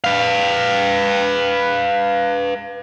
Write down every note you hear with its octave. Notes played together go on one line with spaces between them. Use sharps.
B4 F5